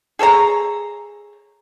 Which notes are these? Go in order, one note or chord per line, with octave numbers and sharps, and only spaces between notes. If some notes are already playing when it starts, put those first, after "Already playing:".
G#4 A4 C#5 A#5